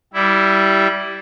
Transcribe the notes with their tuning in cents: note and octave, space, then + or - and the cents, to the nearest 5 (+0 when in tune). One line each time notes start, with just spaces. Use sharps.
G3 -10 E4 +0